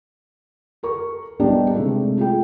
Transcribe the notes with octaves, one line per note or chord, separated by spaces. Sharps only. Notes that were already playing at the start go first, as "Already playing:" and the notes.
A4 A#4 C#6
G3 B3 D4 D#4
C3 G#3 A3
F4 G#4 G5